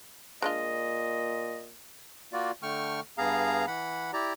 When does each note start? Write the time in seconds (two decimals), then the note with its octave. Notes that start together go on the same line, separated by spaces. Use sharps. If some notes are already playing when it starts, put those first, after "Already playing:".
0.42 A#2 G#3 D4 F4 D#5
2.33 A#3 F4 F#4 D5
2.63 D3 A3 G5 C#6 F6
3.18 G2 B3 G#4 F5 A#5
3.67 E3 F#5 B5
4.13 E4 G4 D5 A#5